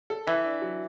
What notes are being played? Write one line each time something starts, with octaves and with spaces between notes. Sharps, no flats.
A4
E3 E5
D4
F#3